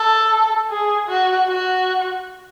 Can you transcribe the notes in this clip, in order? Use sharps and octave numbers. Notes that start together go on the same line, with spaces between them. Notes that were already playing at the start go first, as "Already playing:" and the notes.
Already playing: A4
G#4
F#4
F#4